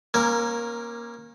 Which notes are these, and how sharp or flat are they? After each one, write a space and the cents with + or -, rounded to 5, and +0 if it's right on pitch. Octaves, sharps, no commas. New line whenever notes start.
A#3 +15 C#4 -25 A#4 +0